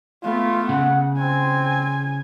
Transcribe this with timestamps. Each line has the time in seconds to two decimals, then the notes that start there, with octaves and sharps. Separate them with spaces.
0.24 A3 B3 F4
0.69 C#3 F#5
1.18 C4 G#5